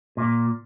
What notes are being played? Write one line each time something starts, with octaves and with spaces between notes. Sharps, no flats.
A#2